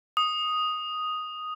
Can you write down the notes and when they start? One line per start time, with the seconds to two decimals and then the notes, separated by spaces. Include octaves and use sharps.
0.17 D#6